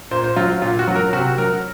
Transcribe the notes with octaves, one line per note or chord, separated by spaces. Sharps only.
A#2 C5
C5
F#3 F4
A#2 F4
F#4
F#3
A#4
C3 F#4
F#3 A#4